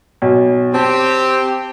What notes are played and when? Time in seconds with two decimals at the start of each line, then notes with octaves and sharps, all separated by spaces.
0.22 B1
0.74 C4 G4 A5